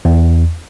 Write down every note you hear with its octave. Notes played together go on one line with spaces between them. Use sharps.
E2